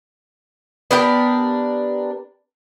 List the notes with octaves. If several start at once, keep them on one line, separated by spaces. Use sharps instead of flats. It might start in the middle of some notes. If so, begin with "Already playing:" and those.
B3 D4 G4 A#4